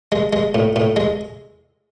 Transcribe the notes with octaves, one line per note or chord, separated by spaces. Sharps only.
G#3
G#3
A2
A2
G#3